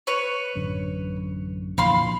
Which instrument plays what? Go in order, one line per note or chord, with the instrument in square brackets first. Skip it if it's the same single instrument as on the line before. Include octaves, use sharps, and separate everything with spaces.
[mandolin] B4 C#5
[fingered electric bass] A1 F#2 D3
[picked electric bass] A#1 [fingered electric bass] F2 D3 E3 [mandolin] F5 B5 C6